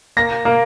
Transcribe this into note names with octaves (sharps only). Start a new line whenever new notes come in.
A#3 A#6
A#3